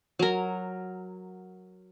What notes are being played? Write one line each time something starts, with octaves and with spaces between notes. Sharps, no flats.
F#3 A#4